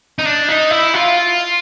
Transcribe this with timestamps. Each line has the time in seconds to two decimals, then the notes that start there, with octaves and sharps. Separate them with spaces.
0.19 D#4
0.26 D4
0.49 D#4
0.71 E4
0.94 F4